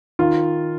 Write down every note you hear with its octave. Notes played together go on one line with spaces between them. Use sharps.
D#3 F4